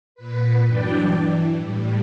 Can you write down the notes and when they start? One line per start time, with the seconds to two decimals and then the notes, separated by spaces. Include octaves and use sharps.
0.15 A#2 B4
0.65 G2 E3 F#3 D4 D5 G5
1.15 E3
1.59 A2 G3